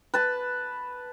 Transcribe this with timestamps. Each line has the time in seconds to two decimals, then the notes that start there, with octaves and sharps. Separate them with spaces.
0.14 B4 A5